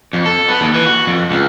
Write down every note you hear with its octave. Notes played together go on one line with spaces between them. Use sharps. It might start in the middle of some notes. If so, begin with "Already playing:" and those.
F2
A4
B3
D#2
E3
F#4
F2
C#2